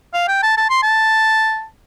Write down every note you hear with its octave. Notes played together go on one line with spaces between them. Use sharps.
F5
G5
A5
A5
C6
A5